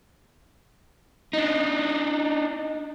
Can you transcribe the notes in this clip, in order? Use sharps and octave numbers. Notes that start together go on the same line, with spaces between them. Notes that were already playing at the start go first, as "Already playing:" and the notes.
D4 D#4